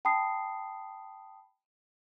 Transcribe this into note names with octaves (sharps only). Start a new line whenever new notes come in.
G5 A5 B5 D#6 C7